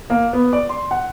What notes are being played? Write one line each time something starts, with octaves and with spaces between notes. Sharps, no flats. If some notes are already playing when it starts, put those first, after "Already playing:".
A#3
B3
D5
C6
F#5